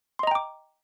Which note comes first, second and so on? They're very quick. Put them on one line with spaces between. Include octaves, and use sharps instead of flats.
C6 D#5 A#5 G5 D6